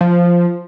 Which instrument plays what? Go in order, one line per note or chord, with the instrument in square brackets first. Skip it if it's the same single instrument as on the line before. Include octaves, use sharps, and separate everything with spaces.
[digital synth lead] F3